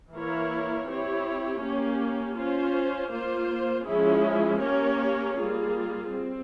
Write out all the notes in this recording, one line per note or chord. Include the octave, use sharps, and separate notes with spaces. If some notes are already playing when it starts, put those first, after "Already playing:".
E3 A#3 E4 A#4 C#5
C4 E4 G4 C#5
A#3 C#4 G4
C#4 F4 C5
A#3 F4 C5
F3 G#3 C#4 E4 G#4
A#3 C#4 G4 A#4 C#5
G3 A#3 F4 G#4
C4